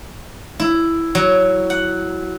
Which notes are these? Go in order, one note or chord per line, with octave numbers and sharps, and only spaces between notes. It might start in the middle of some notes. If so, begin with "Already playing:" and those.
E4
F#3
F#5